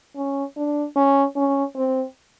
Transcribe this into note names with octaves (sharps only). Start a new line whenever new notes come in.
C#4
D4
C#4
C#4
C4